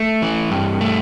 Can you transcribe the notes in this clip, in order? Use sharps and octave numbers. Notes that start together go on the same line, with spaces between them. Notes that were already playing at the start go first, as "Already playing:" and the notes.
Already playing: A3
E3
G2
A3